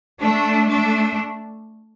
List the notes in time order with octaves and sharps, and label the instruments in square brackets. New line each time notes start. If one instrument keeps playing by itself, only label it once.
[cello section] A3 D4
A3 D4